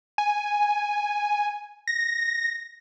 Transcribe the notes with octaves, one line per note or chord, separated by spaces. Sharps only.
G#5
A#6